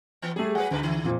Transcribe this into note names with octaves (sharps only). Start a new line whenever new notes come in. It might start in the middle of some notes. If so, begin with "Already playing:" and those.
E3 B3
G3 A3 G#4
F#3 G#4 B4 F#5 G#5
D2 G2 B2 B4
D#3
F2 A#2 C5